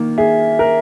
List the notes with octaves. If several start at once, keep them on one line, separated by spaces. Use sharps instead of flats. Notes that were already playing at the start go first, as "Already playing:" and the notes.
Already playing: D#3 A#3
G#4 E5
A#4